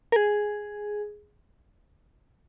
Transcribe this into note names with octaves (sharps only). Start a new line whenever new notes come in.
A#4
G#4